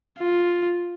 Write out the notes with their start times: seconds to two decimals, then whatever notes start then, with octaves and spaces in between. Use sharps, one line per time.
0.18 F4